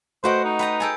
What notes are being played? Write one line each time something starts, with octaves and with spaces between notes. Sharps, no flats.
A3 F#4 B4 C5 D#5 F#5 G5
D#4
B4 G5 A#5
G#4 A4 G5